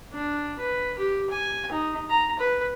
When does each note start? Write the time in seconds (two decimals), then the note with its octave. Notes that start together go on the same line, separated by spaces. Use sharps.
0.13 D4
0.59 B4
0.98 G4
1.30 G#5
1.72 D#4
2.09 A#5
2.39 B4